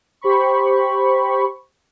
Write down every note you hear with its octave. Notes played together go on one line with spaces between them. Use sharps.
G4 C5 B5 C#6